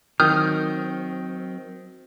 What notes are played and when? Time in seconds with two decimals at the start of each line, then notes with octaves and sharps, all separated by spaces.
0.20 D#3 F#3 C4 D#6 F6 G6